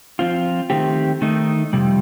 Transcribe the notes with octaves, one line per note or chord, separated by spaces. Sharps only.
F3 C4 F4
D#3 A3 C4 G4
D#3 A3 D#4
F2 C3 G3